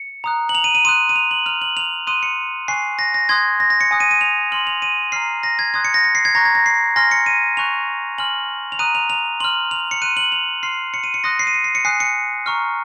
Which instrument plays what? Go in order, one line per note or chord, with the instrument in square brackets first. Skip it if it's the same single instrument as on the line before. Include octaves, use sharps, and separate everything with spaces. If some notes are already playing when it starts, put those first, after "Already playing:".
Already playing: [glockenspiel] C#7
A#5 D#6 F#6
F#7
F7
D#7
D#7
C6 D#6 F#6 D#7
D#7
F7
F#7
A#5 F6 F7
F#7
F7
C6 D#6 F#6 D#7
C#7
G#5 C#6 F#6 C7
A#6
A#6
C6 D#6 F#6 G#6
A#6
A#6
C#7
G#5 D#6 F#6
D#7
D#7
F7
C6 F6 F#7
F7
D#7
A#5 F6 C7
A#6
G#6
C6 D#6 F#6 G#6
C#7
A#6
C#7
C7
G#6
A#5 C#6 F#6 A#6
G#6
A#6
C7
G#5 C6 F6 A#6
C#7
D#7
G#5 C#6 F#6 F7
G#5 C6 F6 F#7
F7
A#5 D#6 F#6 D#7
F7
F7
C6 F6 F#7
F7
C#7
C6 F#6 D#7
F#7
F7
C6 F6 C7
C#7
D#7
C#7
C6 D#6 F#6 A#6
C7
D#7
C#7
C7
C#7
G#5 D#6 F#6 C7
C#7
A#5 C#6 F6